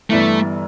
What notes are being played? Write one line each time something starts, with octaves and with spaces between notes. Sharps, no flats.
G1 G2 E3 A3 B3 E4